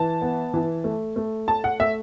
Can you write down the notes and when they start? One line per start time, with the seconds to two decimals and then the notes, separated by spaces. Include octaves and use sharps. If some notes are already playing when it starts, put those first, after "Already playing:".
Already playing: E3 A5
0.22 B3
0.54 E3
0.84 A3
1.16 A3
1.48 A3 A5
1.64 F#5
1.80 A3 E5